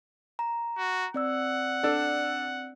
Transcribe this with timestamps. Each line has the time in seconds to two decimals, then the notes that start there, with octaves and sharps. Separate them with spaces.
0.39 A#5
0.78 F#4
1.14 C4 D5 F#5 E6
1.83 D4 A4